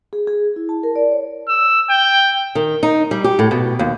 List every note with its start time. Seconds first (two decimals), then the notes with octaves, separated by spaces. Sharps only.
0.13 G#4
0.27 G#4
0.56 E4
0.69 A5
0.83 A#4
0.96 D5
1.12 C#5
1.48 E6
1.90 G5
2.55 D#3
2.83 D#4
3.11 G3
3.24 G4
3.39 A2
3.51 B2
3.79 D#2